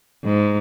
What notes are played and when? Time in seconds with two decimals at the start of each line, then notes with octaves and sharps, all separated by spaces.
0.24 G#2